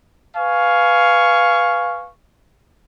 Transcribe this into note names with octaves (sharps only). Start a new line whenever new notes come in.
B4 F5 G#5 C#6